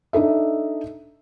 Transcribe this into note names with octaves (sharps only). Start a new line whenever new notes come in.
D4 D#4 A4 E5